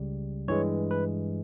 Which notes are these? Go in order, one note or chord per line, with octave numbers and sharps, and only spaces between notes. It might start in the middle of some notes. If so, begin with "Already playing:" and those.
Already playing: C#2 C#3 G3
G2 E3 G#3 C#5
B4